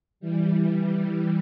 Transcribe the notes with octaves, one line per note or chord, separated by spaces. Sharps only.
E3 G3
E3 G3